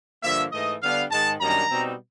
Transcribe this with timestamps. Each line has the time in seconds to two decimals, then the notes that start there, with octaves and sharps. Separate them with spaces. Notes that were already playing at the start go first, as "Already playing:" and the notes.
0.23 G2 D3 F3 A#3 E5
0.52 G#2 E3 A3 D#5
0.81 D3 G3 B3 D4 F5
1.11 G#2 D#3 G#3 A5
1.40 F#2 D#3 G3 A#3 D4 A#5
1.71 B2 G3 C4 D#4